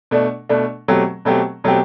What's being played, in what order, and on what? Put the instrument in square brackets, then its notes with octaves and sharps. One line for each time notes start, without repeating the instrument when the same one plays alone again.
[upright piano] B2 A3 D4
B2 A3 D4
B2 F#3 A3 C4 G4
B2 F#3 A3 C4 G4
B2 F#3 A3 C4 G4